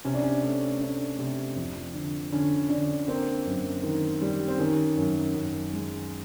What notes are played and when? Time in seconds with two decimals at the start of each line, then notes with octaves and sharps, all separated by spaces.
0.05 C3 C#4
0.14 D4
0.23 C#4
0.43 A3 C#4
0.81 A3 D4
1.19 C3
1.56 F2
1.94 D3
2.33 D3 C#4
2.70 D3 D4
3.08 A#3 C4
3.46 F#2
3.83 D#3
4.22 G3
4.48 C4
4.59 D#3 C#4
4.97 F#2
5.35 F#2
5.74 G#3